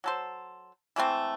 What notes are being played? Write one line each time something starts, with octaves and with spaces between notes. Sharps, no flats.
F#3 A4 C5
E3 G#3 A3 C4